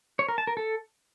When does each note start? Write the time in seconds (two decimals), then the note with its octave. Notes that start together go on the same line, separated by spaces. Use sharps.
0.19 C#5
0.29 A#4
0.38 A5
0.47 A#4
0.57 A4